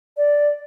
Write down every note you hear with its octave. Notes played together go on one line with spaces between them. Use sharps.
D5